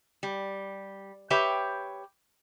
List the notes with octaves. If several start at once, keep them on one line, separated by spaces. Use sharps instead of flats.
G3
G4 B4 C#5 E5 G5